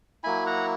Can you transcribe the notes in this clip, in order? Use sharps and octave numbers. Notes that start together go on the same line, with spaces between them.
F#3 A#3 E4 G#5 B5
F#5 A#5